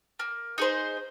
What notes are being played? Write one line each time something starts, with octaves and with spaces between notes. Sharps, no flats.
A#3
D#4 G#4 C5